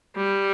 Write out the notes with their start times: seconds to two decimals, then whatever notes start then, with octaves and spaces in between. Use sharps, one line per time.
0.16 G3